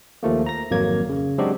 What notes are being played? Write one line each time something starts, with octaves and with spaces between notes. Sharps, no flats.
D#2 F3 A3 A#3
A#5 A#6
G#1 F2 F#3 A#3 G#6
C#3
F#3 G#3 C4 D4 F#4 G4